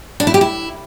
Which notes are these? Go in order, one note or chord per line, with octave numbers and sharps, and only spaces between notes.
D4
E4
G4
E4